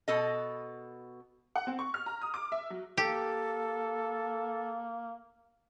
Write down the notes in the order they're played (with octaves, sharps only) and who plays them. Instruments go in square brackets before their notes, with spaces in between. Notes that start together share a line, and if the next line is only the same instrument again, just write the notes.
[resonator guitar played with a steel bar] B2 A4 D#5
[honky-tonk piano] F#5
C4
C#6
F6
A#5
D#6
D6
E5
F#3
[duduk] A#3 [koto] G4 [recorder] A4